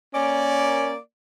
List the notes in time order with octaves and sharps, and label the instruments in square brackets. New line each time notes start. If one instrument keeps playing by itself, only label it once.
[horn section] A#3 D5 [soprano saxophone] C#4